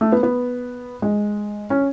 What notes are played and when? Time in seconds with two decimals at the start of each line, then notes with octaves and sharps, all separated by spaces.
0.01 A3
0.12 B3
0.23 B3
1.02 G#3
1.70 C#4